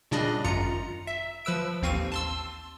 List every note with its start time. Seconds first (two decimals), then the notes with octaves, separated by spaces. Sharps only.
0.11 A#2 C#3 G3 D4 D5 D#5
0.44 G#1 F#2 F4 A#5 C#7
1.07 E5
1.45 F3 B4 E6 D7
1.82 A1 D#2 C4 F5 C#6 D#7
2.12 A5 C6 E6